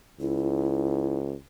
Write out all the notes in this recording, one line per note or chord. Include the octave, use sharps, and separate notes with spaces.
C#2 E4